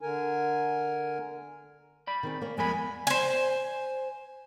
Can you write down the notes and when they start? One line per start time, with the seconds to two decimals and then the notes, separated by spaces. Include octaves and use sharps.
0.01 D3 A#4 G#5
2.07 D5 B5
2.23 D#3 C4 G#4
2.41 A#3 C#5
2.58 F2 G#3 B3 A#4 G#5 B5
3.07 C5 G#5